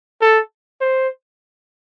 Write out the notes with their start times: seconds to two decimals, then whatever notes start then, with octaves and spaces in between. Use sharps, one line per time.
0.21 A4
0.81 C5